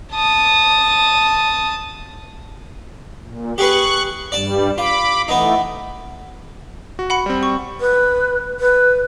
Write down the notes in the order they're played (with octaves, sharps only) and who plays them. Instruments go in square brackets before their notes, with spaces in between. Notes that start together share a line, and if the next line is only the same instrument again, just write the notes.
[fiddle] A5 D#6
[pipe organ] A#2
[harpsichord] G4 G#4 B4 [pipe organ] C#6 F#6
[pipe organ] G2 G3 [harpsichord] D5 A5
[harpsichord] F4 [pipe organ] B5 D6
[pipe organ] E3 A3 [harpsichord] B3 D#4
[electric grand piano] F#4
[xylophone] F#5 B5 C#7
[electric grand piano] G3 C4
[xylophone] C#6
[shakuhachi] B4
B4